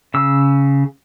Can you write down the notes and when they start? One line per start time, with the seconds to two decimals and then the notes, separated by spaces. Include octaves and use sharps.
0.14 C#3 E6